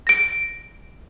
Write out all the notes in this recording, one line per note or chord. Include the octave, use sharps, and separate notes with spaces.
A#6 D7